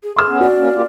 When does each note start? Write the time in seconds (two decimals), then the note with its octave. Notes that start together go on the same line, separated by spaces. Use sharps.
0.03 G#4
0.16 G#4 C6 E6 F6
0.28 B3 C#4
0.41 F#4 D5
0.57 A#3 C#4
0.74 A#3 F4 G4